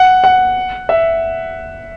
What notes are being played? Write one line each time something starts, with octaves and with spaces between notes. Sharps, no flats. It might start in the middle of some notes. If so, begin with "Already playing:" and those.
Already playing: F#5
F#5
E5